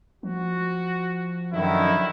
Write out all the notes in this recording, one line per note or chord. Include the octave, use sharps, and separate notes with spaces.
F3 F#4
F#2 D3 D#3 E4